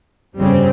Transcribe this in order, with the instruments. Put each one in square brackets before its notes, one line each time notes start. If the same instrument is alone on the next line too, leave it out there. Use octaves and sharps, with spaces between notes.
[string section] G1 F2 C#3 G3 C4